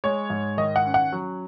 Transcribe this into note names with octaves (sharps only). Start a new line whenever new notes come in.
G#3 C#5
G#2
D#3 D#5
F#5
C#4
F#5
F#3